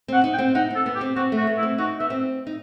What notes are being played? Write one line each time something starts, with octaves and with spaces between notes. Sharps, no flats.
C4 F#5
D#4
G5
C4
D#4 F#5
C4 A4
B3
G4
C4
C4 F#4
A3
F#4
B3
E4
C4
D#4 F#4
B3 E5
C4
D#4